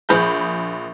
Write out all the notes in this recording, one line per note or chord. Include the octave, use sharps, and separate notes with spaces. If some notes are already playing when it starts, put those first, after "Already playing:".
A#1 G#4 B5 G6